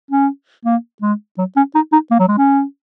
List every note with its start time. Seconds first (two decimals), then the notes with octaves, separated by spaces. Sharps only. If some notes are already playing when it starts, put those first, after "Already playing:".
0.11 C#4
0.65 A#3
1.02 G#3
1.38 F#3
1.56 C#4
1.75 D#4
1.92 D#4
2.11 A#3
2.19 F#3
2.28 G#3
2.38 C#4